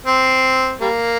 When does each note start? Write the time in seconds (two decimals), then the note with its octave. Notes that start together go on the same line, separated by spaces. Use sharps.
0.07 C4
0.81 G3 A#3